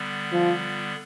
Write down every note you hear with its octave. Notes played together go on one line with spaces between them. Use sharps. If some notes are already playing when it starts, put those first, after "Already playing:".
Already playing: D3 G3 B3
F3